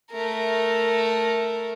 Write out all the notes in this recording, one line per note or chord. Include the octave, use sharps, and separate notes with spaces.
A3 A#4